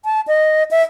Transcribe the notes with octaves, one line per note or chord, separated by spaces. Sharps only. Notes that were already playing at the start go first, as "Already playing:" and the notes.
A5
D#5
E5